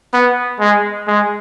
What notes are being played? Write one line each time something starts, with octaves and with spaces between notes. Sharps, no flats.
B3
G#3
G#3